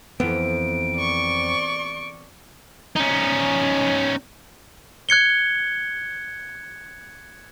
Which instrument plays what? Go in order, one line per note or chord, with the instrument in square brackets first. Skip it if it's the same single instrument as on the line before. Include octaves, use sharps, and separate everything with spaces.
[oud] F2 [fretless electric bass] E3 B3 [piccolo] D7
[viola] D5 C#6
[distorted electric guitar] C#4 D#4
[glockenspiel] F#6 G#6 C#7 G7